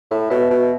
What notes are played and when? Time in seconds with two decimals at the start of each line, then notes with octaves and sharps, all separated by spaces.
0.11 A2 E5
0.30 B2 E5
0.50 B2